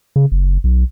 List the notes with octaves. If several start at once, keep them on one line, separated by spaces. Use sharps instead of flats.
C#3
F#1
B1